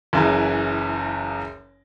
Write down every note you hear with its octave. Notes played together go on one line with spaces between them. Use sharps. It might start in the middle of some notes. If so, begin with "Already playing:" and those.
F#1 F#2 C#3 E3